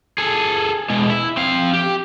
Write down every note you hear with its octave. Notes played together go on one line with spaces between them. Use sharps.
G#4 A4
B2 G#3
E4
C4 F5
G4